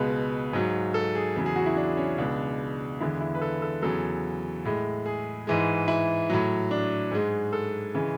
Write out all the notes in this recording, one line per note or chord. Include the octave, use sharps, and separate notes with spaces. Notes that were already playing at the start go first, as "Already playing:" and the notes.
Already playing: C#2 B2 G#3 B4
G#2 F#3
A4
G#4
E2 C#3 F#3
G#4
F#4
E4
D4
C#4
C#2 B2 G#3 D4
E2 D3 G#3 E4
E4
B4
A4
A4
E2 C#3 F#3 A4
A2 G#3
G#4
G#2 E3 G#3
E4
A2 F#3
D4
G#2 G#3
A4
C#3 E3 G#3